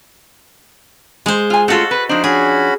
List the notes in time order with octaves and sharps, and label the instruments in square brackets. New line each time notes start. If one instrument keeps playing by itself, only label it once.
[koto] G#3 C5
[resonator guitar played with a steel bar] F4 G#5
[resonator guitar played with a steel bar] A3 C#4 F4 [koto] F#4 A4
[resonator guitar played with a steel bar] B4 [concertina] F#6
[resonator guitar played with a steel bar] F3 D4 [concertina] D#4 C5
[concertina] C#4 F#4 B5 [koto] G#4